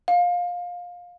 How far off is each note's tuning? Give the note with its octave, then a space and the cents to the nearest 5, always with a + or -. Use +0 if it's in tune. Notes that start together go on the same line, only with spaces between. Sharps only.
F5 +20